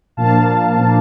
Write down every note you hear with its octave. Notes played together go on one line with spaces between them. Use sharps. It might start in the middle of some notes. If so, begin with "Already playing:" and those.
A#2 F3 A#3 D4 F5 A5
A#2 F3 A#3 D4